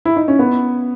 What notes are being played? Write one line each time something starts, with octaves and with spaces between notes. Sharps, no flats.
E4
D#4
C#4
B3